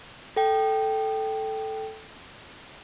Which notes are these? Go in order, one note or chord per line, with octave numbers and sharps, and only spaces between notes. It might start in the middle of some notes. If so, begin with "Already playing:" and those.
A4 G5